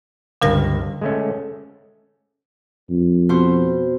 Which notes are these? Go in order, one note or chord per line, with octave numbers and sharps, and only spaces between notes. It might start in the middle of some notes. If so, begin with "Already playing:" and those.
C#2 G2 D3 A#4 F5 A#6
G#3 A3 C#4
F2
B2 C5